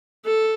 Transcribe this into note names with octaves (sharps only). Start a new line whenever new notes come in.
A4